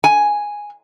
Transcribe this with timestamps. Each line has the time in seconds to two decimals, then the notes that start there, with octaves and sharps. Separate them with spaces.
0.04 G#5